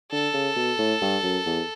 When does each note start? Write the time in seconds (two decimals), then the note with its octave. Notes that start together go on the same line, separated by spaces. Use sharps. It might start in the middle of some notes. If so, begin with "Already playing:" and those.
0.11 D3 A4
0.33 C#3
0.56 B2
0.78 A2
1.01 G2
1.23 F#2
1.46 E2